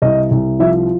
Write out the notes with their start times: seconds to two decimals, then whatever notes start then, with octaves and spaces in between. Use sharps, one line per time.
0.02 C2 D#5
0.31 C2
0.60 F3 E5